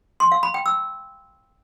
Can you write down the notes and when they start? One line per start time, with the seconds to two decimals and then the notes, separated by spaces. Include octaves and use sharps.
0.20 C6
0.32 F5
0.43 B5
0.54 G5
0.66 E6